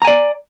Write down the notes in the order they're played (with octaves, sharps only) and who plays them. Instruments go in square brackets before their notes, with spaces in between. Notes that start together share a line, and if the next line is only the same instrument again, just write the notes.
[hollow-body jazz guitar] A#5
G#5
D5